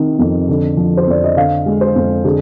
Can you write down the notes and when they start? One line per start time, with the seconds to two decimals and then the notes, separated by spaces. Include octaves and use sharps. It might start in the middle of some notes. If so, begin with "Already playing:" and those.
Already playing: C3 D#3
0.19 F2
0.49 D3
0.77 F3
0.97 C5
1.07 F2 D5
1.24 D#5
1.36 D3 F5
1.66 G#3
1.81 C5
1.96 F2
2.24 D3 G#4